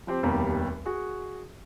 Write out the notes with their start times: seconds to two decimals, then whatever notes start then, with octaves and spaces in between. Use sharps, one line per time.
0.07 F3 C4 G4 C5
0.23 F1 D#2 B2 G3 A#5
0.86 F#4 G#4